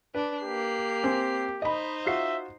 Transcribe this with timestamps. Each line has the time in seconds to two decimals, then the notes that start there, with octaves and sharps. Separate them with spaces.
0.15 D4 B4
0.43 A#3 G4 C7
1.04 C4 G#5
1.62 D#4 C5 D#5 B5
2.06 F4 F#4 E5 C7